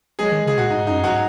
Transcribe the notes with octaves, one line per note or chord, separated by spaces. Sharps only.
F#3 G#3 G#4
D#3
C#3 G#4
A#2 F#4
G#2 D#4
F#2 D#4
G#2 F#3 F#4